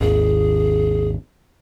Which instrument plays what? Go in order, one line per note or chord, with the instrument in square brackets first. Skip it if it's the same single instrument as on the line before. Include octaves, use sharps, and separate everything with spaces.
[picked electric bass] G#1 D#2 [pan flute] G#4